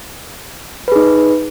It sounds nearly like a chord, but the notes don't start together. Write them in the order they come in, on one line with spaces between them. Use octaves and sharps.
B4 G#4 D#4